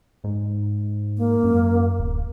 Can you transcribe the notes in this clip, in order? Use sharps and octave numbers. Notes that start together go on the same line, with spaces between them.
G#2
A#3
F#2
D1